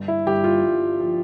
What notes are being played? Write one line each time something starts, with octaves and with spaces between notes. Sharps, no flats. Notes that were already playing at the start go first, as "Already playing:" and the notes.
Already playing: G1
E4
G1 G4
F4
G1
F3